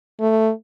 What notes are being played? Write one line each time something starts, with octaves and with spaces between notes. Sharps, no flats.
A3